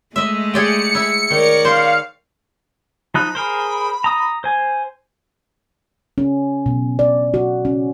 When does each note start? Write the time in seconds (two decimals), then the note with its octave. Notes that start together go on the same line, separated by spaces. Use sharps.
0.16 G#3 A3 D#5 E5
0.54 G#4 D5 G5 C#7
0.95 E4
1.31 D#3 A#4 C#5 D5
1.65 C5 F5
3.14 F3 D#4 B5 F#6
3.35 G#4 A#4 C5
4.04 A#5 D#6
4.44 C5 G#5
6.18 C#4
6.66 B2
6.99 D5
7.34 F#4
7.65 C#4